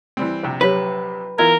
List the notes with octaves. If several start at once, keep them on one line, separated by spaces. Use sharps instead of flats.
E3 G3 C4
A#1 C3
F#3 G4 B4 C#5
E3 B3 E4 F4 A#4 G#6